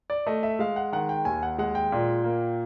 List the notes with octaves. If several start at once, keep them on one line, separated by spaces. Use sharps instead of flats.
D5
A3 D#5
E5
G#3 F5
F#5
D#3 F#5
G5
D#2 G#5
F#5
G#3 F#5
G5
A#2
A#3